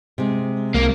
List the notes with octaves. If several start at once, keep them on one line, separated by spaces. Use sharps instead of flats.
C3 G#3
C2 A#3